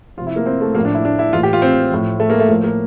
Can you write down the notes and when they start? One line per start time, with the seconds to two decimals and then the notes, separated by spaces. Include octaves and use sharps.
0.17 F3 F4
0.21 C3
0.27 E4
0.36 A#3
0.46 C4
0.61 A3
0.75 A2 F3 A#3
0.85 D4
0.95 E4
1.05 D4
1.19 E4
1.33 A2 E3 F4
1.43 G4
1.53 F4
1.62 C4
1.92 A2 F3
2.20 A3
2.30 A#3
2.40 A3
2.49 A2 F3 A#3
2.64 A#3